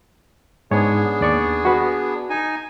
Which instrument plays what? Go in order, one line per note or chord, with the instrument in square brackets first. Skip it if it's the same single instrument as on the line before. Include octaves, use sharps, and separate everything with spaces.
[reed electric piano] G#2 C#5 [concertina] B3 D4 G#4
[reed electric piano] D#2 D5 C#6
F#4 B4
[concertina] D#4 G#5